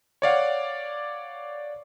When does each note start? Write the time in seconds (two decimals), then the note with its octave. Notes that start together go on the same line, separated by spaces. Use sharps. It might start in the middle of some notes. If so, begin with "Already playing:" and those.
0.22 C#5 D5 F5 F#5